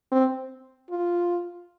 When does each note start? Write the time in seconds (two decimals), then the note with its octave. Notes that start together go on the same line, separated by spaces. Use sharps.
0.12 C4
0.90 F4